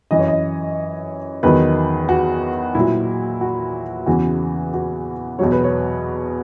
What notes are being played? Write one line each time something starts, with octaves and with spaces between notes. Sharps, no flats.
F#2 E3 D#5
C#5
D#5
E2 D#3 F#3 B4
F#4
A#2 F#3 E4
F#4
E2 C#3 E3 F#4
F#4
E2 B2 F#3 C#5
B4
C#5